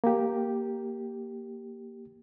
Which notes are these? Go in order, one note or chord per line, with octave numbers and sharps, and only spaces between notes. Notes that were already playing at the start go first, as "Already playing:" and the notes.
A#3 G4